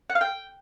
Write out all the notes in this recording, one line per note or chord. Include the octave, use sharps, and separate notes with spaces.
F#5
F5
G5